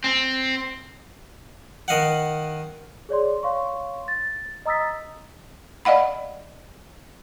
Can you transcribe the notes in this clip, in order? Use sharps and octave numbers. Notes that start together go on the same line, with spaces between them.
C4
D#3 D#5 F5 F#5
G#4 C#5 D5 C6
C#5 F5 C6 C#6
A6
D#5 A#5 D#6 E6 A6 B6
D5 D#5 F5 F#5 B5